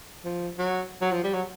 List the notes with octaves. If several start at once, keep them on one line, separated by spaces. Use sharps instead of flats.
F3
F#3
F#3
F3
G3
F#3